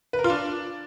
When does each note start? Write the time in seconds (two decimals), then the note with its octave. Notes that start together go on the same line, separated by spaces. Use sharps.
0.13 B4
0.19 A#4
0.24 F4
0.30 D4